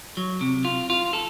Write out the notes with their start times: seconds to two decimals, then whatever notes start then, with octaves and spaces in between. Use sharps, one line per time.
0.17 F#3
0.41 C3
0.65 F4
0.90 F4
1.13 A4